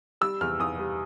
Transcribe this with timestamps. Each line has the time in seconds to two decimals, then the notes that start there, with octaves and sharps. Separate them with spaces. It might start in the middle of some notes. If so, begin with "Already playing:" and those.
0.21 G3 E6
0.41 E2 F6
0.59 E2 D#6
0.79 G3